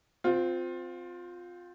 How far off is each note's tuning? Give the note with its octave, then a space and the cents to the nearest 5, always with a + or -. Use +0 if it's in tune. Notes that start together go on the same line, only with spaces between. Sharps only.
C4 -15 F4 +20